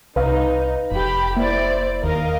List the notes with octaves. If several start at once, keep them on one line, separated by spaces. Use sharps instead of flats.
C2 D#4 B4 F5
F1 G4 B5
A#3 E4 C5 D5
D#2 A#4 D#5 F5